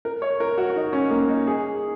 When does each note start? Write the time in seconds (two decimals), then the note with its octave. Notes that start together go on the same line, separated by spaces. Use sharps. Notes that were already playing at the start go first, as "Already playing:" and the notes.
0.05 A#4
0.22 C#5
0.40 A#4
0.58 F#4
0.70 F#4
0.76 D#4
0.93 C#4
1.10 A#3
1.29 D#4
1.47 G#4